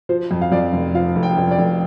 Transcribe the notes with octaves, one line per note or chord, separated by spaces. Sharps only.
F3 C5
F2
F5
F2 D5
F1
F3 F5
F1
G5
F1
D5
F1